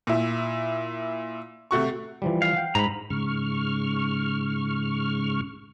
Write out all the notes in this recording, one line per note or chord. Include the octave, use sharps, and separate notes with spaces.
A#2 E4
C3 A3 F#4 C#6
E3 F3 G3
F5
F#5 G5
G#2 A#5 B5
G#2 C#3 C#6 F6